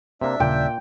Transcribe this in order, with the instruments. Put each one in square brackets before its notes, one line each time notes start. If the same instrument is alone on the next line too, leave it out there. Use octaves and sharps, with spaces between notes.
[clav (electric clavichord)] C3 A#3 [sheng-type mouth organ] D4 E5
[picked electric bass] D#1 C#3 [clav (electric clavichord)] A#2 [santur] G5